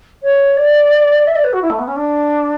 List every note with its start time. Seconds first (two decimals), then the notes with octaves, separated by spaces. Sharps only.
0.23 C#5
0.57 D5
1.27 E5
1.36 D5
1.44 B4
1.53 F#4
1.62 E4
1.70 A3
1.79 B3
1.88 C#4
1.96 D4